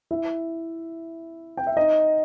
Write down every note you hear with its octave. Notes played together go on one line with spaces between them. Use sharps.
E4 E5
G5
E5
D#4 D#5